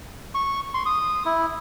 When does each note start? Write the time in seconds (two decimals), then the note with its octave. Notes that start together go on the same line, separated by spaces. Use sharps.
0.35 C#6
0.74 C6
0.86 D#6
1.25 E4